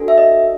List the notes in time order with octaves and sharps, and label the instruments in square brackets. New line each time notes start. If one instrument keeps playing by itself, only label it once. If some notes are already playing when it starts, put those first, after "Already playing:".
Already playing: [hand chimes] D4 F#4 A4
E5
D#5